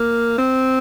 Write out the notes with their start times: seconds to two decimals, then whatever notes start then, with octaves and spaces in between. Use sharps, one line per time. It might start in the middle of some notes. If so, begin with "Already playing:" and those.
Already playing: A#3
0.38 C4